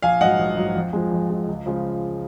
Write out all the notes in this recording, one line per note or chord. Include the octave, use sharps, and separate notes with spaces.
A#1 F5 G#5
G#2 F#3 D#5 F#5
A#1
G#2 F#3
F2
F3 G#3
F2
F3 G#3
C#2
C#3 F3 G#3